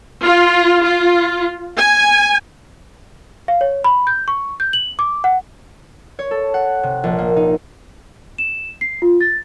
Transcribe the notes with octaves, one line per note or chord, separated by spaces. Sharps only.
F4
F4
G#5
F5
C#5
B5
G6
C#6
G6
F#7
D6
F#5
C#5
A4
F#5
C3
A#1
A#3
D#4
E7
C7
F4
A6